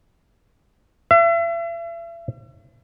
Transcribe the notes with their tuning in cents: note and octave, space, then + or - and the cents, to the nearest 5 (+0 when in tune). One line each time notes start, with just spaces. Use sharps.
E5 +40